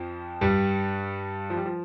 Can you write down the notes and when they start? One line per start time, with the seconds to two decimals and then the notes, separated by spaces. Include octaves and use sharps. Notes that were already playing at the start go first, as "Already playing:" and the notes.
Already playing: F2 F3
0.41 G2 G3
1.50 F3
1.57 G3
1.66 F3